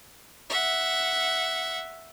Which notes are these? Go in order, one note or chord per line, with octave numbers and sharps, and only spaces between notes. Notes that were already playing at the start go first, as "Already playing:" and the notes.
E5 F#5